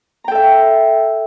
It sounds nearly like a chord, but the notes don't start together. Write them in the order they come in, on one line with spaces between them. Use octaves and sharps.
A#5 G5 A4 E5